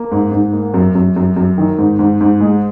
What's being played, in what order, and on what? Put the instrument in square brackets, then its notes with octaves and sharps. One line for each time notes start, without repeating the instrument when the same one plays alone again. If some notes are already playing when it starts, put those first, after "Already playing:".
Already playing: [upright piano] A#3
G#2
G#2
A#3
F#2
F#2
F#2
F#2
D#3
G#2
G#2
G#2
G#3